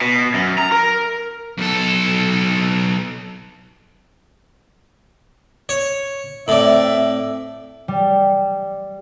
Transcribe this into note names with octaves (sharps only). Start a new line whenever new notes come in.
B2
F#2
A#5
A#4
B1 A4
C#5
A2 C4 D5 E5
G3